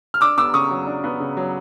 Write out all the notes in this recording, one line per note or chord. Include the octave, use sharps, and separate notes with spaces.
F6
D4 D6 E6
B3 D6 E6
C#3 C#6 D#6
F#3
D4
B3
C#3
F#3